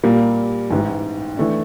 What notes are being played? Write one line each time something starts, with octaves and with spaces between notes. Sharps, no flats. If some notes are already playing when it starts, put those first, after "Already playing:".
A#2 G3 A#3
A1 G#2 E3
E3 A3 D4